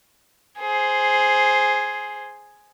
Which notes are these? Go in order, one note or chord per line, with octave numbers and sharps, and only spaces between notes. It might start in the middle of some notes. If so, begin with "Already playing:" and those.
G#4 C5